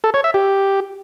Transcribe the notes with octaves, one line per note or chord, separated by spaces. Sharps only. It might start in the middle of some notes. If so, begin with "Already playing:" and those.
A4
C#5
E5
G4